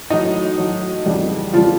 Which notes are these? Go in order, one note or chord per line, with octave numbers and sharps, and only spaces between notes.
A2 F#3 D#4
A2 F#3
F2 C#3 E3 G3
F2 C#3 E3 F3 G3 F4